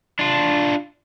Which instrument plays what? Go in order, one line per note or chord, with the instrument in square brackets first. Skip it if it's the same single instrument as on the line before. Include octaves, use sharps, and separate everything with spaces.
[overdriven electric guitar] D4 F4